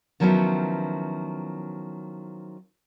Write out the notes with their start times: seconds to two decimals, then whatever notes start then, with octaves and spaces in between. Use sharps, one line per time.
0.20 D#3 F3 F#3 B3 C#4 E4